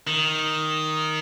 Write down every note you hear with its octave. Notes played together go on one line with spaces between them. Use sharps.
D#3